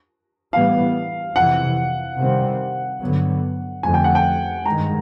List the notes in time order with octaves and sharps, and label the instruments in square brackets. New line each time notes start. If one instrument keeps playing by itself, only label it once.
[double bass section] A2 E3 G3 B3 [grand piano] F5
[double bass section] F2 C3 E3 [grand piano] F#5
[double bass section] C3 D#3 G3 C4
G2 D3 F#3 B3
[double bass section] F2 D3 F3 A3 [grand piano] G#5
[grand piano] G5
F#5
G5
[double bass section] G2 D#3 G#3 [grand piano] A#5